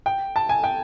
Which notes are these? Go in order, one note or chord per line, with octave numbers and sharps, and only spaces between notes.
G5
A5
G#5
G5